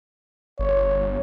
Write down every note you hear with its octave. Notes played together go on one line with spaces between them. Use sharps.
G1 C#5